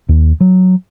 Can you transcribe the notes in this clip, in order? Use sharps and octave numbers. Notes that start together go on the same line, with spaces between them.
D#2
F#3